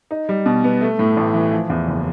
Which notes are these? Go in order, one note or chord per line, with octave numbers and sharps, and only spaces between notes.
D#4
G3
B2
B3
A3
A2
A1
E3
F3
E2
F#1